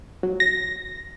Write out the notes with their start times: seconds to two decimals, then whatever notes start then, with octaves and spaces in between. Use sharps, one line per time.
0.23 F#3
0.40 A#6